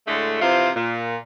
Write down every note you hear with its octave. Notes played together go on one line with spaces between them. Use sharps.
A2 D3 G#3 A3
C3 E3 F3 C4 E4 F4
A#2